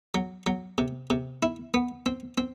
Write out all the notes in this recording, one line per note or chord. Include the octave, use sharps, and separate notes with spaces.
F#3
F#3
C3
C3
E4
B3
C4
C4